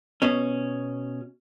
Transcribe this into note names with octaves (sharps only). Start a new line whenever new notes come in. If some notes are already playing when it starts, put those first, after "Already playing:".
B2 C#4